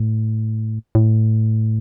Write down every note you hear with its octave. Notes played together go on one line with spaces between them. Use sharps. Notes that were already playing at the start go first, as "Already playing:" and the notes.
Already playing: A2
A2